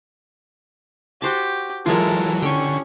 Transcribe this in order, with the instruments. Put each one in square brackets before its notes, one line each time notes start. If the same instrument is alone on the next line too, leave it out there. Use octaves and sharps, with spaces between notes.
[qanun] F#4 C5 A5 [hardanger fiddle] G4
[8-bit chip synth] E3 F#3 [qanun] G#3 E4 F4 [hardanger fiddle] A4 A#4
[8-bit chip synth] D3 C#6 [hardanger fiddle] C#4 [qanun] G4 G5